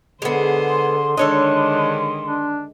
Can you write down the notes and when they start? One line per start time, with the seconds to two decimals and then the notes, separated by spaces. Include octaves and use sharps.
0.22 D3 G#3 B3 G#4 C5
0.68 C6
1.17 D3 D#3 G#3 D4 A4 C#5 D#5
2.27 D4